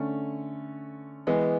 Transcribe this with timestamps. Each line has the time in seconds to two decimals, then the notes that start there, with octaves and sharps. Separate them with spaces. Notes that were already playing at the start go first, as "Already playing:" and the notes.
Already playing: D3 A3 C#4
1.27 E3 G#3 B3